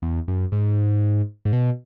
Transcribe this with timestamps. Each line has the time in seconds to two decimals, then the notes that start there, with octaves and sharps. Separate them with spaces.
0.02 E2
0.28 F#2
0.52 G#2
1.45 G#2
1.53 B2